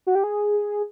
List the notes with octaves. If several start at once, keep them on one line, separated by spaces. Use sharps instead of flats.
F#4
G4
G#4